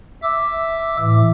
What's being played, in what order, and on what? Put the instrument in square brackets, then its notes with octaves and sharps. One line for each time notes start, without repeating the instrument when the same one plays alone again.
[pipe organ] E5 D6 E6
A2 E3